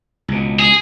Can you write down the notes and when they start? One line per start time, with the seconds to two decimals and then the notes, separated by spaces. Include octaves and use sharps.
0.28 C#2 B2
0.59 G#4